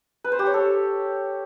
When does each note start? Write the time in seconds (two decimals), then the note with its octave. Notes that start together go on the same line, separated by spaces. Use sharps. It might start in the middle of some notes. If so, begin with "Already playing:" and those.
0.24 B4
0.32 C5
0.39 G4
0.46 C#5
0.54 A4